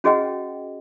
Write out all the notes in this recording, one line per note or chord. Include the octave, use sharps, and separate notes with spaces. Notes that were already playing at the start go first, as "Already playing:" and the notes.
C#4 F#4 G#4 D#5 F#5 G5